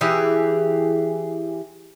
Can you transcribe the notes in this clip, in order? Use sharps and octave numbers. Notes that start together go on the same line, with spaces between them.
E3 G4 G#4